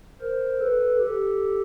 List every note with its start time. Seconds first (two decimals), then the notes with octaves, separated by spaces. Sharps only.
0.20 A#4 C5
0.60 A4 B4
0.99 G4 A4